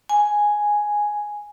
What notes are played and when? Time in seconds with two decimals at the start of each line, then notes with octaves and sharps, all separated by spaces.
0.09 G#5